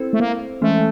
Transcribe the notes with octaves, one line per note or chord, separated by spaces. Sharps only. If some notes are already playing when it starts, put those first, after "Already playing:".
Already playing: C4 E4 A4 C5
A3
A#3
E3 G#3 A3 C#4